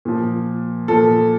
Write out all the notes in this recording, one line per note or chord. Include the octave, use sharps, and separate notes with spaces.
A#2 F3
A#2 F3 A4